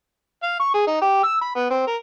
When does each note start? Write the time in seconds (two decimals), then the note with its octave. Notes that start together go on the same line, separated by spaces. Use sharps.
0.43 F5
0.60 C#6
0.74 G#4
0.87 D#4
1.02 G4
1.24 E6
1.41 B5
1.56 B3
1.71 C4
1.87 A#4